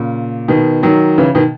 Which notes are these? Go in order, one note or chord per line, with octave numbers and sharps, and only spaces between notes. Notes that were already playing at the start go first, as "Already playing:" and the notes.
Already playing: A#2 C#3
B2 D#3
D#3 F#3
C#3 E3
B2 D#3